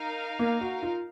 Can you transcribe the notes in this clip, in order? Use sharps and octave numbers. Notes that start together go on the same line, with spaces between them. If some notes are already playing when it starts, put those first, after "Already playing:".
Already playing: D#4 A#4 F5
A#3
F#4
F4